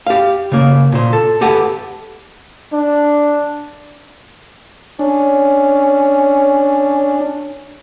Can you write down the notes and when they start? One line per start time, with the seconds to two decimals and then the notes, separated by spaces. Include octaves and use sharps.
0.07 G4 F5
0.52 C#3 A#3
0.92 A#2 C5
1.13 A4
1.41 G4 A4 B4 F#5
2.73 D4
4.99 C#4 D4